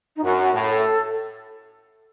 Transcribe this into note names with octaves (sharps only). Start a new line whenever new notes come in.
D#4
F#2 F#4
A2
A4